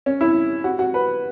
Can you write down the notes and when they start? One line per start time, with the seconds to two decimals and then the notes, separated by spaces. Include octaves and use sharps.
0.06 C#4
0.21 E4
0.64 F#4
0.79 F#4
0.94 B4